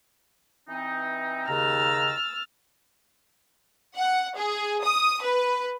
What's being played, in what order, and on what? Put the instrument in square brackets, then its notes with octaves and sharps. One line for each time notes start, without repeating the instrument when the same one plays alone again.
[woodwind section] E3 C4 D#4
[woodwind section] D#2 C#3 A#5 [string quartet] E6 F6 A6
[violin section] F#5
G#4
D#6
B4